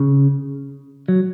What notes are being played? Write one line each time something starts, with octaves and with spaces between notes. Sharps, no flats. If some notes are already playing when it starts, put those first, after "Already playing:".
Already playing: C#3
F#3